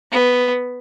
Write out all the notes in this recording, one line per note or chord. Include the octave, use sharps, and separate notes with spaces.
B3